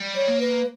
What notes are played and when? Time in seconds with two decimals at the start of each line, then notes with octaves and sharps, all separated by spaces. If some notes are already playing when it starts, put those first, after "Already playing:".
Already playing: G3
0.14 C#5
0.27 A#3
0.40 B4